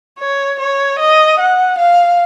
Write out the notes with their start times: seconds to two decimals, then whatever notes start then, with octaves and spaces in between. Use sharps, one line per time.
0.19 C#5
0.59 C#5
0.99 D#5
1.39 F#5
1.78 F5